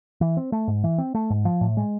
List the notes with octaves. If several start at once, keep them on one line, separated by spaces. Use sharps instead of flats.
E3
C4
A3
G#2
E3
C4
A3
G#2
F3
A2
G#3